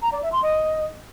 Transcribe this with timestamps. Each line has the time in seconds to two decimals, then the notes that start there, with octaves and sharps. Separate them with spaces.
0.02 A#5
0.12 D5
0.22 E5
0.32 C6
0.43 D#5